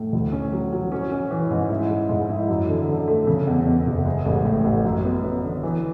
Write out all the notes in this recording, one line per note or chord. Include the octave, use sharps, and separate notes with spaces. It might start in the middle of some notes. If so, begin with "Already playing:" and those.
Already playing: A2
D2
C#4
F#3
F#3
C#4
C#4
E3
G#2
E4
G#3
G#2
E4
F#2
D3
D3
A3
C#3
E2
E2
F#1
G#3
A1
A2
A1
F#2
B3
B3
D3
E3